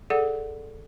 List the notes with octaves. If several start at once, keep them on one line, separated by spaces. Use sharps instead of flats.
G#4 A4 D5 F#5